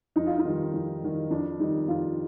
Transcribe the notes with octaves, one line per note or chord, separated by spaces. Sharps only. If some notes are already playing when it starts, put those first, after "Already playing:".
F2 D#4
F4
D#4
D#3 G3
F2
D#3 G3
F2 D4
D#3 G3 D#4
F2 F4